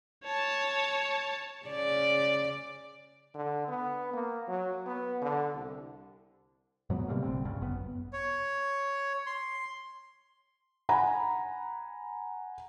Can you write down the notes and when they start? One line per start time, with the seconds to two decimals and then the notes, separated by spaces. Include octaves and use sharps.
0.24 C#5 A5
1.66 C#3 D5
3.35 D3
3.68 B3
4.13 A#3
4.48 F#3
4.86 B3
5.22 D3
5.54 C2
6.90 G#2 F#3 A3 B3
7.08 C3 G3 A3 A#3
7.23 G#1 A#2 D3 C4
7.45 C#2 G2 C#3
7.61 G#1 F#2 B3
8.13 C#5
9.27 C6
10.89 F#5 G#5 A#5 B5